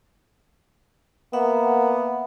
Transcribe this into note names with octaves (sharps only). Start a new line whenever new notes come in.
A#3 B3 E5 F#5